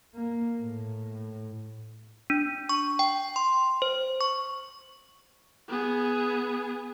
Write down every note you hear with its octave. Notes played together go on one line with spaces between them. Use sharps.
A#3
A2
D4
C#6
G5
C6
C5
C#6
B3 G#4